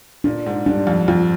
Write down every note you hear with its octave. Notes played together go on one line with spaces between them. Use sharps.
A#2 D4
G#2
G2 D4
F2
F2 F4